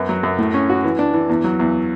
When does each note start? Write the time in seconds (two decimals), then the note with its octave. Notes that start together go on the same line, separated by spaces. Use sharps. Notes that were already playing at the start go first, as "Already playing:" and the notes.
Already playing: F#2 B3
0.09 F#3
0.23 F#2
0.38 A2
0.54 C#4
0.69 F#4
0.84 E3
0.99 D4
1.14 E3
1.29 E2
1.44 F#3
1.60 E2